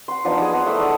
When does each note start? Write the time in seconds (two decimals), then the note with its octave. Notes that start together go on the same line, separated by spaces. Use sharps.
0.08 F#5 C6
0.25 F3 B3 D4 D#4
0.38 D#4 G#4
0.52 C5 D#5 F#5 C6
0.66 A3 E4 F#5 E6
0.81 A3 D4 F#5 D#6